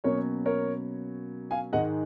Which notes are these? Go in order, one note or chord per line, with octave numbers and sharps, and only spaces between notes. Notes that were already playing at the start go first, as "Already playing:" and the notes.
B2 F#3 A#3 C#4 A#4 C#5
A#4 C#5
F5 G#5
G#2 D#3 G#3 D#5 F#5